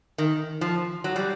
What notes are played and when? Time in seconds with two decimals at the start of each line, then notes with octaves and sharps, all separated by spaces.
0.18 D#3
0.61 F3
1.04 F#3
1.16 G3